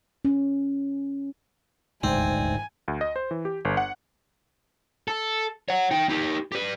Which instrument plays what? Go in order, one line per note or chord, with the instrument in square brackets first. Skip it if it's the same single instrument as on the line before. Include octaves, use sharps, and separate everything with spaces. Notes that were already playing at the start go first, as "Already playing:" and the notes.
[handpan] C#4
[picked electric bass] D#1 A1 D2 [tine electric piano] G#2 [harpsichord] C4 [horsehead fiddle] G#5
[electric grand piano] D2
D#5
C5
E3
G4
G1
F#5
[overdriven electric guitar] A4
C#5 F#5
D#4 G5
D#4 G4
G4 B4